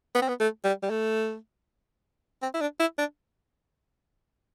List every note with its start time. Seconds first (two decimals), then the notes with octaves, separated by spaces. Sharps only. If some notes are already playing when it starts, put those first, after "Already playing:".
0.15 B3
0.22 C4
0.28 B3
0.40 A3
0.64 G3
0.82 G3
0.90 A3
2.42 C4
2.54 E4
2.61 D4
2.80 E4
2.98 D4